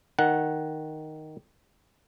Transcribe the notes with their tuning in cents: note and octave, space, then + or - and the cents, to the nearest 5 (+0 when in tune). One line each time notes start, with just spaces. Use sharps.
D#3 +0 F#5 +0